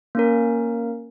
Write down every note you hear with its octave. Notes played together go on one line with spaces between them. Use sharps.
A#3 C#4 A#4